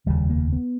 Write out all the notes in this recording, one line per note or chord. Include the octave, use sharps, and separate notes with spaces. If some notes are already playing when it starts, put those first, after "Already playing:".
F1 D#2 C#3 G3
A#3
B3